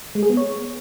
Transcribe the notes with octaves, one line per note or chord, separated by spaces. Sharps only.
G#3
G#4
B3
C#5